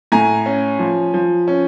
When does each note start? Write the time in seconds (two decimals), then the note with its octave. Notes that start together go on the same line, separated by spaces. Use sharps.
0.12 A2 G#5 A#5
0.46 C#4
0.79 F3
1.14 F3
1.48 C#4